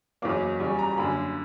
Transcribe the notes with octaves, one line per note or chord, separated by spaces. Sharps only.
F#1 E2 C#3 F#3 A#3 D6
E2 C#3 G3 C#6
A#5
A#5
F#2 D3 A#3 B5